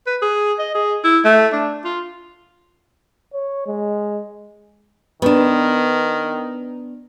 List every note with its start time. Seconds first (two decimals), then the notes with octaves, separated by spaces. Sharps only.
0.07 B4
0.22 G#4
0.59 D#5
0.75 G#4
1.04 E4
1.25 A3
1.52 D4
1.85 F4
3.34 C#5
3.67 G#3
5.22 D#3 B3 D4